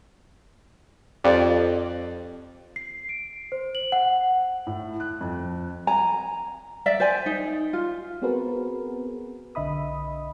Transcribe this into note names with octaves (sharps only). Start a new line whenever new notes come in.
F2 G4 D5
C7
D7
C5
F#7
F#5
A2
F#6
F2
G#5 A#5
D5 E5
C5 D5 G#5
D#4
F4
B3 C4 F#4 G#4 A#4 B4
B1 D3 D#5 E5 B5 D#6